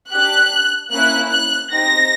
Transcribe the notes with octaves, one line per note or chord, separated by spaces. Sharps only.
D4 G4 F#6
A#3 C#4 E4 F#6
F#6
C4 D#4 G4 A#6